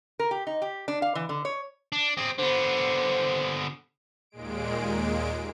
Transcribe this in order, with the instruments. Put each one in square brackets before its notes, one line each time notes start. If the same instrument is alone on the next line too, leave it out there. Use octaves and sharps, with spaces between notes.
[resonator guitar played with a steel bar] A#4
G4
D#4
G4
D4
F5
E3
D3
C#5
[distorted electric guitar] D4
C4 G#4
[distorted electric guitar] D3 B3 [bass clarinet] C5
[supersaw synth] D#2 A#2 G#3 D7